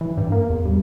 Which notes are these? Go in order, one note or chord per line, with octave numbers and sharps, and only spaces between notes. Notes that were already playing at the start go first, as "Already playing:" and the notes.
E3
G2
A#3
E2
G2